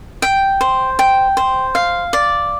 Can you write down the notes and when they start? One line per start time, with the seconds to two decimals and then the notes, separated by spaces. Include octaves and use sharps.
0.22 G5
0.61 C5
0.99 G5
1.37 C5
1.75 F5
2.13 D5